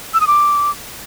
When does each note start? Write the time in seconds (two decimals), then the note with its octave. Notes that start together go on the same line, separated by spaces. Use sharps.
0.14 E6
0.21 D#6
0.27 D6